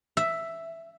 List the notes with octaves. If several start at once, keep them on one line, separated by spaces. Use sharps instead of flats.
E5